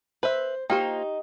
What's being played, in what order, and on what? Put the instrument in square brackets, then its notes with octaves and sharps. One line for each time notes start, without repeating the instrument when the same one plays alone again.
[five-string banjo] B4 E5 [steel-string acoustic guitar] C5
[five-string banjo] A#3 F4 C5 [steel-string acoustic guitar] D#4 [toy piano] G4 G5